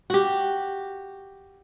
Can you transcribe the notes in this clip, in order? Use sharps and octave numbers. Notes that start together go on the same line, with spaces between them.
F#4 G4